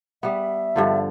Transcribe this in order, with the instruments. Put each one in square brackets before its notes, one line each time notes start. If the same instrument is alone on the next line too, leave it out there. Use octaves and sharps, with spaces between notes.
[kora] G3 B3 [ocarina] E5
[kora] G2 D3 F3